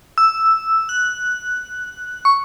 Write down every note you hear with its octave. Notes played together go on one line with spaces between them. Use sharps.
E6
F#6
C#6